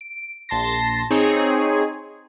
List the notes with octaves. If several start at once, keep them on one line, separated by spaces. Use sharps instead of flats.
D7
A#1 A5 C6 A#6
C4 D#4 G#4 C#5